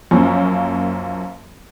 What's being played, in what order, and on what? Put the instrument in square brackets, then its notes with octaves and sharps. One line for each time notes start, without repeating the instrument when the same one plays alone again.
[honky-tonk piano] F#2 F3 A#3 C#4